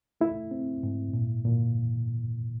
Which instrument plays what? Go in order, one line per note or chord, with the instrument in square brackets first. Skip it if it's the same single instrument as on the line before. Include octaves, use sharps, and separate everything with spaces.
[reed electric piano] A3 E4
C4
G#2
A#2
A#2